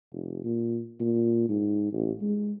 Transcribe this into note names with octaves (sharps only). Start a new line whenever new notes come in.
F1
A#2
A#2
G#2
A1
G#3